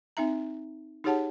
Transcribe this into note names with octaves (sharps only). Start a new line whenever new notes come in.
C4 D#4 E5 A#5
D#4 G4 G#4 C#5 F#5 A5